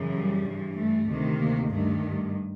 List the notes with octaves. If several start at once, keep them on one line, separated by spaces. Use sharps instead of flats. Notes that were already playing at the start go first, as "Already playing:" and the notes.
Already playing: F#2 C#3 E3
G3
G2 E3
A3
D2 C3 D#3
A#3
G2 D#3 A3